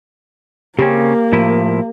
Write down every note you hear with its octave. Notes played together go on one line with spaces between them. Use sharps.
C#3 A#3 C4 C#4 G4
A2 F3 E4